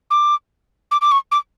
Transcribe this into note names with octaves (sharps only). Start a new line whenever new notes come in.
D6
D6
D6
C#6
D6